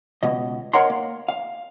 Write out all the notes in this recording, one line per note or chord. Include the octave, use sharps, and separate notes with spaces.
C#2 B2 D#5
A#4 C#5 D#5 F#5 A#5 C6
A#3
F5